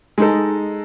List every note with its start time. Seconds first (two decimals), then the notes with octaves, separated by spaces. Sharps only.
0.18 G#3 D#4 A4